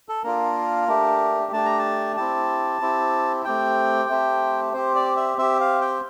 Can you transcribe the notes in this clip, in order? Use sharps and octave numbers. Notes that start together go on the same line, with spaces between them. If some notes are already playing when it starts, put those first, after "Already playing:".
A4
A#3 D4 F4 A#4
A3 D4 G4
A3 D4 G4 A5
A#5
A5
C4 E4 G4 A5
C4 E4 G4
A3 C4 G4 G5
A3 C4 G4
C4 G4 C5
D5
E5
C4 G4 E5
F5
G5